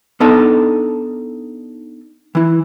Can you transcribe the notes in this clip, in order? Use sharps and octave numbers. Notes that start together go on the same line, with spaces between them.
B3 D4 D#4 A4 D#5 A5
E3 E4